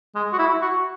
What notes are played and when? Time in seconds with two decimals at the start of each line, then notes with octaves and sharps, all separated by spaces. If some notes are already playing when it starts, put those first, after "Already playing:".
0.15 G#3
0.33 F#4
0.39 E4
0.61 F#4